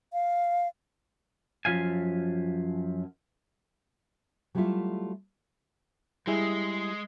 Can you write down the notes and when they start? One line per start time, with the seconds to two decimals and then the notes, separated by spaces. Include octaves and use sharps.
0.13 F5
1.65 F#2 F3 F5 G#5
4.55 F#3 G3 A3 E4 F4 E5
6.27 G3 G#3 E4 G#4